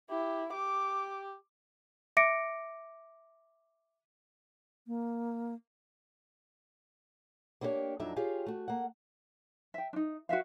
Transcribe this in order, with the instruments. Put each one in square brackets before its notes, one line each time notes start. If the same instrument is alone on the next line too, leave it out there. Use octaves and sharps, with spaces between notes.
[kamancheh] E4 [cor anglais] G4
[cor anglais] G4 [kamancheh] D6
[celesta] E5 D6 A#6 C#7 D7
[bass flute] A#3
[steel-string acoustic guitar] A#3 B3 D4 E4 G4 C#5
F2 F#3 D4 D#4 E5
F4 G4 G#4 C#5 F5
A3 F#4
A#3 F#5
[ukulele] E5 G5
D4 D#4
F#4 B4 E5 F5